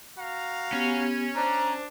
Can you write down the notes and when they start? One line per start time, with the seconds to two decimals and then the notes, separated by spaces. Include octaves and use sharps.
0.18 F#4 F5 A#5
0.73 B3 C#4 G4
1.35 D4 C5 A#5